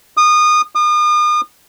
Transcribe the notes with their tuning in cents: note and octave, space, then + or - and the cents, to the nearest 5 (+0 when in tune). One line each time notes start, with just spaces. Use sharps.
D#6 -25
D#6 -40